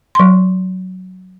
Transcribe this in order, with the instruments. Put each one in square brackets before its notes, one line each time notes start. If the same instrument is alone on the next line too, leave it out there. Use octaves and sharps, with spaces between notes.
[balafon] F#3 C6